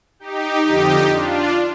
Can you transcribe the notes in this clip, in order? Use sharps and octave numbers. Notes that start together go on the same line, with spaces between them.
D#4 G4
F2 D3 F3 D#4 G4
D4 F4